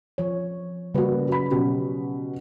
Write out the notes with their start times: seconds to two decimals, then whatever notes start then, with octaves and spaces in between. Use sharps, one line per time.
0.18 F3 C#5
0.95 C#3 G3 A#3 F#4 B4 D5
1.28 F#3 B5
1.51 B2 F#3 C#4 G4